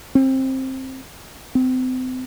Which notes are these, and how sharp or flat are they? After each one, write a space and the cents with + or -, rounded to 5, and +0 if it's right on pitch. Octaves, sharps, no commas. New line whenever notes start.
C4 +15
C4 -35